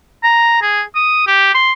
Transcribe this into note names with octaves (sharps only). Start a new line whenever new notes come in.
A#5
G#4
D#6
G4
C6